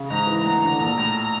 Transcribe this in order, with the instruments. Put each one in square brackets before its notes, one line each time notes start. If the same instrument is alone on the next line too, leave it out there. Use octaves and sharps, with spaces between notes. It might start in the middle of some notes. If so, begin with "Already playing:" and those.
Already playing: [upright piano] C#3
[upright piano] G#2 [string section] A#5
[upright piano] E3
[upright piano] D2 [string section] A#5
[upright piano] D3
A#1
A2